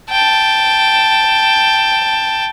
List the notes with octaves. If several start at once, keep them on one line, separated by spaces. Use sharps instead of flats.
G5 A5